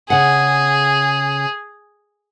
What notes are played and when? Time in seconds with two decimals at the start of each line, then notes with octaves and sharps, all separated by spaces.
0.10 C#3 G#4 F#5